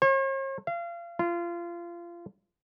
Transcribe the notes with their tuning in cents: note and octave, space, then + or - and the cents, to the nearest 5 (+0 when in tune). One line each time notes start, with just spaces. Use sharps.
C#5 -45
F5 -30
F4 -25